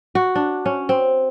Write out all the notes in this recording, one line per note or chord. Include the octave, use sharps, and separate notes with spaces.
F#4
D4
C#4
C4